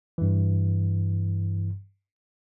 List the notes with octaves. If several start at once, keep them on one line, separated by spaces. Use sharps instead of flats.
G2 E3